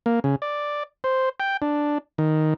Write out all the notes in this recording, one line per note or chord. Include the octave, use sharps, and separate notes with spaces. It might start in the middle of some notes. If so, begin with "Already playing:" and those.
A#3
C#3
D5
C5
G5
D4
D#3